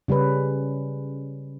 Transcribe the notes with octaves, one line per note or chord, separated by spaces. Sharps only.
C#3 G3 C#4 B4